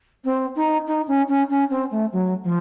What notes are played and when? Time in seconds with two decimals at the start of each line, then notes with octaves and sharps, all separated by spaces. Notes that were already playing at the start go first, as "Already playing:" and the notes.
0.24 C4
0.55 D#4
0.86 D#4
1.07 C#4
1.28 C#4
1.49 C#4
1.70 C4
1.91 A3
2.12 F#3
2.43 F3